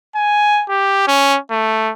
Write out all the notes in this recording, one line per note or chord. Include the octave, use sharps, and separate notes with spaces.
G#5
G4
C#4
A3